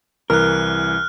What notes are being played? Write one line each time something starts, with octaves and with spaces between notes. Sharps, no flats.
C2 E3 A#4 F6 F#6